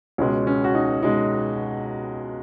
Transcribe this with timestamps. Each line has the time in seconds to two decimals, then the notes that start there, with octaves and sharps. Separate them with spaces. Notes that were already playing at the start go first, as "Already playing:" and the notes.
0.18 C#2 B2 G#3 C#4
0.47 C#4
0.64 F#4
0.75 D#4
1.03 B2 G#3 D#4